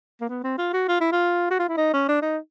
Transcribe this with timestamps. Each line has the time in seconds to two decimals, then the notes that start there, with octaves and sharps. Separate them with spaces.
0.21 A#3
0.29 B3
0.44 C4
0.58 F4
0.73 F#4
0.88 F4
1.00 E4
1.12 F4
1.50 F#4
1.59 F4
1.68 E4
1.77 D#4
1.93 C#4
2.08 D4
2.22 D#4